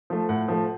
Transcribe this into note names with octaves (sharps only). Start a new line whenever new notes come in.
F3 A3
A2 F#5
F3 A3